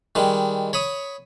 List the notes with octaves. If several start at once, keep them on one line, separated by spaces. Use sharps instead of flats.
D#3 G3 G#3
C#5 B5 D#6